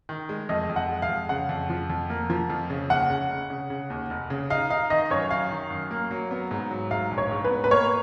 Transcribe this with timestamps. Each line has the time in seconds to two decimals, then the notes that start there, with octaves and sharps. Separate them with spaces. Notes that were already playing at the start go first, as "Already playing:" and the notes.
0.09 D#3
0.29 G#3
0.49 F2 D#5
0.69 F2
0.76 F#5
0.89 G#3
1.02 F5
1.09 F2
1.29 C#3 F#5
1.49 F2
1.70 F3
1.90 F2
2.10 A#3
2.30 F3
2.50 F2
2.70 C#3
2.90 D#2 F#5
3.10 C#3
3.30 F1
3.50 C#3
3.70 C#3
3.90 D#2
4.10 F1
4.30 C#3
4.50 D#4 F5
4.70 D#4 F5
4.90 D#3 D#5
5.10 F#2 C#5
5.31 D#3 F5
5.50 D#3
5.71 F#2
5.91 A#3
6.11 F#3
6.31 B3
6.51 G#2
6.71 F#3
6.91 G#2 F5
7.11 A#1
7.18 C#5
7.31 G#2
7.45 B4
7.51 B3
7.64 B4
7.71 A#3 C#5